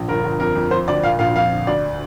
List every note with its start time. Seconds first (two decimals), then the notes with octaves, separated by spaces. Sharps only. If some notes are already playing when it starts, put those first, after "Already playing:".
Already playing: A#1
0.09 G1 A#4
0.24 G1
0.40 F2 A#4
0.55 F2
0.71 F3 C5
0.88 D2 D5
1.03 A#2 F5
1.19 A#1 F5
1.35 F2 F5
1.51 D3
1.67 D2 D5